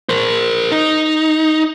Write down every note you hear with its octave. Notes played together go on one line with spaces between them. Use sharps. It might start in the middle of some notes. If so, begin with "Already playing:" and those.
A#4 C5
D#4